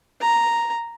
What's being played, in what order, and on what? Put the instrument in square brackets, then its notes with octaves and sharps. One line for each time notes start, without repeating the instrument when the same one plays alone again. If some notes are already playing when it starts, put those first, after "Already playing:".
[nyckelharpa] A#5